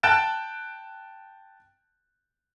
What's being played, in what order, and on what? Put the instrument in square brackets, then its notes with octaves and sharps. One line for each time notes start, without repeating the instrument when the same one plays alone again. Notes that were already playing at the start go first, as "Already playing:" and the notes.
[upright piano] G5 A5 F#6 A6 D7 E7